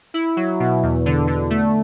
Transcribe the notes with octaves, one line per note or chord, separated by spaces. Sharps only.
E4
F#3
B2
E2
D3
D3
A3